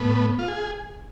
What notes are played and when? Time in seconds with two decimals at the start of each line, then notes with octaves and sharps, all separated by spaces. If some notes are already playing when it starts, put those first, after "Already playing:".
Already playing: A2 B3
0.39 F4
0.48 G#4